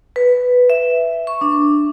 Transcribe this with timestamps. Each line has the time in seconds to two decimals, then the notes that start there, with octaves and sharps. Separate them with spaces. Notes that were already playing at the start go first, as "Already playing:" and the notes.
0.16 B4
0.70 E5
1.27 C#6
1.41 D4